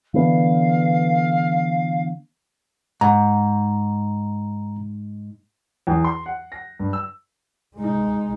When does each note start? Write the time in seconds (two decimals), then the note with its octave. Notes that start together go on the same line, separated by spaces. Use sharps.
0.14 D3 E3 B3 F5
3.01 G#2 A#5
5.87 E2
6.04 C6
6.26 F#5
6.52 A#6
6.80 G2
6.93 E6
7.77 G#3 D#4